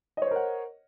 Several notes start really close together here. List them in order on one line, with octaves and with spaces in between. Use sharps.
D#5 C#5 C5 A#4 F#5